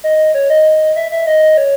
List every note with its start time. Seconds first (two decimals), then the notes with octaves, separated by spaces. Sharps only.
0.04 D#5
0.34 C#5
0.50 D#5
0.96 E5
1.11 E5
1.27 D#5
1.57 C#5